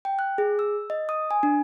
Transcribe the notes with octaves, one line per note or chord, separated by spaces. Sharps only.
G5
F#6
G#4
E6
D#5
D#6
G#5
D4